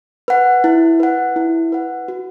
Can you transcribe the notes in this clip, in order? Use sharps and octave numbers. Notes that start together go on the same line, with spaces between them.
B4 F#5
E4
B4 F#5
E4
B4 F#5
F#4